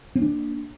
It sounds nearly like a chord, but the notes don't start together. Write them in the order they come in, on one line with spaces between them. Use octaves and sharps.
C4 A#3 D4